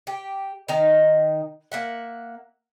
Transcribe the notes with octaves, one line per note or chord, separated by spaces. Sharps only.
G4
D#3 D#4 A#5
A#3 E5 F#5